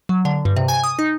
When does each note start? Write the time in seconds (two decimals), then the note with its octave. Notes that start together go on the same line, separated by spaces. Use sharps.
0.09 F#3
0.25 D3
0.45 G2
0.56 C3
0.68 G#5
0.84 D#6
0.99 D#4